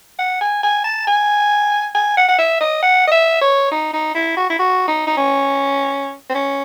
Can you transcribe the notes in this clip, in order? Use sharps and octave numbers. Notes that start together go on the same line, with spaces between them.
F#5
G#5
G#5
A5
G#5
G#5
F#5
F#5
E5
D#5
F#5
D#5
E5
C#5
D#4
D#4
E4
F#4
E4
F#4
D#4
D#4
C#4
C4
C#4